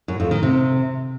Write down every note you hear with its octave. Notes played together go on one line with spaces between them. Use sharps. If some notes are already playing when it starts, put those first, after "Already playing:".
F#2
F2
D#3
C3